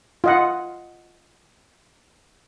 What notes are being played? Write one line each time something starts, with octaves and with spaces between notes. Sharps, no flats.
F4 D#5 F#5